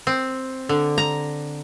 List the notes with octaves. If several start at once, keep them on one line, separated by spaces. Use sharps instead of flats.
C4
D3
A#5